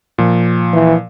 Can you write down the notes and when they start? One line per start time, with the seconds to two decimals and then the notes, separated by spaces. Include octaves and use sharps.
0.18 A#2 F3
0.73 E3